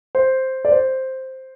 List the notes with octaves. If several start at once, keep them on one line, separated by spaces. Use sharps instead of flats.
C5
D5
C5